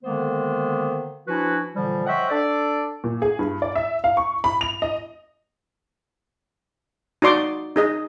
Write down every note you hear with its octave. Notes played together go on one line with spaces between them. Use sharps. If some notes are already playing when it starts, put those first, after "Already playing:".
D3 D#3 G#3 A#3 B3 C5
F3 C#4 D4 E4 F#4 B4
A#2 D3 E3 F3 G3
C5 C#5 D#5 E5 F#5 G5
D4 A4 D5
A#2
G#4
G2
D5
E5
F5
C#6
B5
F7
D#5
D#4 F#4 D5 C6 D6
D#4 G#4 D#5